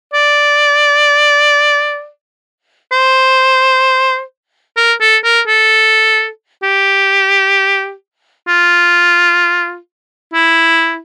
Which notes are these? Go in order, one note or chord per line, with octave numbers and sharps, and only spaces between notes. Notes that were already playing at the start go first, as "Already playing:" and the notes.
D5
C5
A#4
A4
A#4
A4
G4
F4
E4